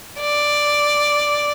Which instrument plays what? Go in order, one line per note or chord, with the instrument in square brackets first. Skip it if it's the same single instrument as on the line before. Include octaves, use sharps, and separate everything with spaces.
[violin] D5